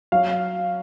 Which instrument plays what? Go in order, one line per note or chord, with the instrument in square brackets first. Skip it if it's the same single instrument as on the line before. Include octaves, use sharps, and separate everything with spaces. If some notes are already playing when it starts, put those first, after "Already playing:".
[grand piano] F#3 F5